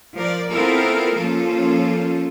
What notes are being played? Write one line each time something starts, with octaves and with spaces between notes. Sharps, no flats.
F3 A#4 D5
B3 C4 E4 F4 A4 A#4
F3 A#3 C#4 F4 A4